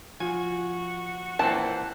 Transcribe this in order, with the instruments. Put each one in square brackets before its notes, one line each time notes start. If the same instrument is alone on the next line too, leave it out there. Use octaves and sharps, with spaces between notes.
[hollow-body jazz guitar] F3 [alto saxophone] F#4 [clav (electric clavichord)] G#5
[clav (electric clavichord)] A#2 E3 C4 [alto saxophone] F#5 [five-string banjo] A5